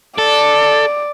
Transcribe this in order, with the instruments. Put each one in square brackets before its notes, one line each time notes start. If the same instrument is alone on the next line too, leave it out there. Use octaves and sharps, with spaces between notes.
[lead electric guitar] A4 [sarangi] D5